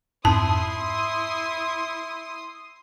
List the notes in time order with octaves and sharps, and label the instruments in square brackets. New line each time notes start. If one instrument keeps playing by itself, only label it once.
[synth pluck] F2 G#2 [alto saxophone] E4 [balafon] A5 [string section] C6 D#6